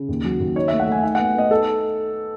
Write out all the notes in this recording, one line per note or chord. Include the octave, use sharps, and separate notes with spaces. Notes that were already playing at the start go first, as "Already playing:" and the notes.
Already playing: C#3
D#2
F#3
D#2
D#4 C#5
E5
A3
F#5
A3 G#5
D#4 F#5
F#5
B3
B3 D#5
D#4 A4